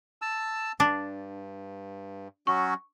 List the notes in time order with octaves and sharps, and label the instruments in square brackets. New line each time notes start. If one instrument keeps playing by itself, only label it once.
[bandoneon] A5 E6
[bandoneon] G2 [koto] D4
[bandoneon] F#3 C#4 F#4 [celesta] C#6